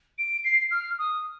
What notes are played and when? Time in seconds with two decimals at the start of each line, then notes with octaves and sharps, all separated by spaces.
0.18 D7
0.44 C7
0.71 F6
0.99 D#6